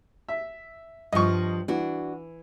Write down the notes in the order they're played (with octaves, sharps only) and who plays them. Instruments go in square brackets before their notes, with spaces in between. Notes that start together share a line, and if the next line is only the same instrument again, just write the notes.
[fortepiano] E5
[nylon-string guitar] G2 F3 [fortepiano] D#5 C#6
[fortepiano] E3 [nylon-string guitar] D4 F#4